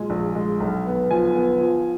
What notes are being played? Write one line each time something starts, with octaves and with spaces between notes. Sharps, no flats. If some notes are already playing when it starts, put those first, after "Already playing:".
Already playing: A#2 F#3 G#3 G#5
A#1
G#3
B1
B3
F3 G#5
B3
F3